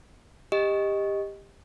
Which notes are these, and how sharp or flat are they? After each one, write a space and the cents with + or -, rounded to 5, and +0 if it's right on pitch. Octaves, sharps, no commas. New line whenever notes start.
G4 +20 D#5 +0